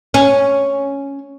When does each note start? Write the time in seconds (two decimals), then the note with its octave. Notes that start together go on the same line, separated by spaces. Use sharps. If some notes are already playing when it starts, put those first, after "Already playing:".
0.14 C#4